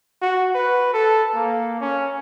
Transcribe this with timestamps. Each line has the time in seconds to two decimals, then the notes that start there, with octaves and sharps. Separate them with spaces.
0.22 F#4
0.55 B4
0.94 A4
1.35 A#3
1.80 C#4